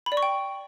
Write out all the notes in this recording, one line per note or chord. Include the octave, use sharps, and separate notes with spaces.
B5
D5
C#6
G5